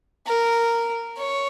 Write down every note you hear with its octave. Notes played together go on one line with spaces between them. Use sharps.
A#4
C#5